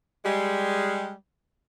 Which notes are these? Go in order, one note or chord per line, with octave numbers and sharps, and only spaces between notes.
G3 G#3